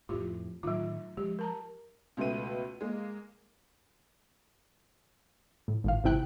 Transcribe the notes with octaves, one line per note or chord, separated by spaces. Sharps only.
F2 A2 F4 G4
A2 D#3 F#3 F4
F3 G#3 G4
A#4 A5 A#5
C#2 B2 A3 B4 D#7
G#3 A#3
A2
G#1 A2 F5
G#1 C3 E4 G5 F#6